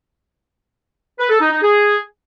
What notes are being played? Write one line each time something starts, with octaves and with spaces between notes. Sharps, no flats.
B4
A4
D#4
D#4
G#4